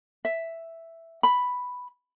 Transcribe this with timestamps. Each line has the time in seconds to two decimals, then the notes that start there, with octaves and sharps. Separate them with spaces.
0.25 E5
1.23 B5